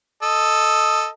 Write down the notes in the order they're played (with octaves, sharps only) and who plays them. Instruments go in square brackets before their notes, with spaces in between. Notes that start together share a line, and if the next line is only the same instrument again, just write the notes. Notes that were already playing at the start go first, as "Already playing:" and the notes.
[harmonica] A4 D#5